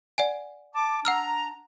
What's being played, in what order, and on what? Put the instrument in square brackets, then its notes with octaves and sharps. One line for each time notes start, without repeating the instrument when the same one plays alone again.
[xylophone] D5 F#5 G#5
[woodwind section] A5 D6
[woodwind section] D4 A#5 [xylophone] F#5 E6 F6